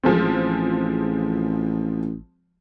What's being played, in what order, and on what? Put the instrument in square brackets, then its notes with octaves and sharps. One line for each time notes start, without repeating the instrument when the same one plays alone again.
[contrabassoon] A1 [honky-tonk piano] F3 G#3 C4